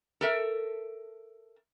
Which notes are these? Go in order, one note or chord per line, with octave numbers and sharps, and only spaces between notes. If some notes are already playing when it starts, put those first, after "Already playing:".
A4 A#4 E5